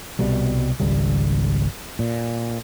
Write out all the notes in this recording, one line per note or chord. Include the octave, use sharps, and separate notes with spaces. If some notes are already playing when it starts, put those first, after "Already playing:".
C2 B2 G3
G#1 C#2 G3
A#2